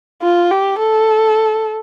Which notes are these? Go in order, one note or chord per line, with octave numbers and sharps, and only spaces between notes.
F4
G4
A4